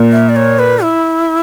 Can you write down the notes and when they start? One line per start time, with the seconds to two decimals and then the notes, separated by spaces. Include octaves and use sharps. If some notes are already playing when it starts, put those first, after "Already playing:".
Already playing: A#2
0.12 E5
0.29 D5
0.36 C#5
0.59 B4
0.83 E4